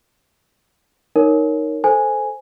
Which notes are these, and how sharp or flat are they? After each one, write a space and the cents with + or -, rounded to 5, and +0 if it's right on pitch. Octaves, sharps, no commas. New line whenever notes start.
D#4 +0 A#4 +0 C#5 +0
A4 +0 C5 +0 G#5 +0